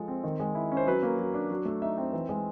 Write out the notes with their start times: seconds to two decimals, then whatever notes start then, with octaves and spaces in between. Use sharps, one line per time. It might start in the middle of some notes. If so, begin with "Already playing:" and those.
Already playing: F3 G#3 A4
0.08 C4
0.24 D#3
0.40 G#3
0.55 E4
0.72 C#4
0.77 C5
0.86 F#3 B4
1.03 A#3
1.19 F#3
1.34 D4
1.50 F#3
1.65 A3
1.82 D#4 E5
1.98 C4
2.13 E3
2.29 G#3